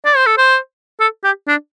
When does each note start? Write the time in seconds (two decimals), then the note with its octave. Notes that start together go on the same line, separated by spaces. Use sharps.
0.05 D5
0.16 C5
0.26 A4
0.38 C5
1.00 A4
1.24 G4
1.48 D4